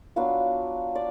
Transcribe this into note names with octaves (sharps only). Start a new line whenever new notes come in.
F#3 B3 D4 F4 F5
D5